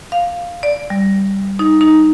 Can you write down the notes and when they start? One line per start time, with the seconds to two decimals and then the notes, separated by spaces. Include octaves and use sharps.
0.12 F5
0.63 D5
0.90 G3
1.59 D#4
1.81 D#4